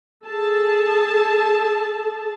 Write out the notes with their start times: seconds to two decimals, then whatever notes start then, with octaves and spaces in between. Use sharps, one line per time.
0.27 G#4 A4 A5